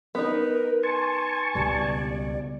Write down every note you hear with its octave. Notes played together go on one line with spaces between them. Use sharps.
B3 D#4 A#4
G#5 A5 C6 C#6
C#2 B2 G3 D5